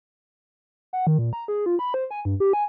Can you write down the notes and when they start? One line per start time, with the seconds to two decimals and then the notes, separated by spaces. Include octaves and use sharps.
0.93 F#5
1.07 D#3
1.18 A#2
1.33 A#5
1.48 G#4
1.66 F4
1.79 B5
1.94 C5
2.11 G#5
2.25 G2
2.40 G4
2.53 G#5